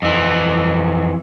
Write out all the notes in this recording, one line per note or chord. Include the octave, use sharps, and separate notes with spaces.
F2 E3